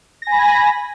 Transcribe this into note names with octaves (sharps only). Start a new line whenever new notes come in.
G#5 B5 A#6